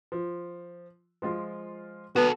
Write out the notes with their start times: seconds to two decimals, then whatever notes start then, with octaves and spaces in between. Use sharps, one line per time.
0.12 F3
1.22 F3 G#3 F4
2.16 B3 F#4 A4